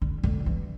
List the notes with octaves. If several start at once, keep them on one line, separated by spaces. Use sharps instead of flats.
D3
D3
E3